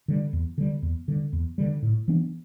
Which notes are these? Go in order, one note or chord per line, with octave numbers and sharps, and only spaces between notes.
D3 G3
E2
D3 G3
E2
D3 G3
E2
D3 G3
A2
E3 B3 D4